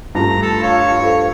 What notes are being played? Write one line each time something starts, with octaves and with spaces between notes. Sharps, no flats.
G2 A3 F4 A#5
A4
C#5 F5
A4 C5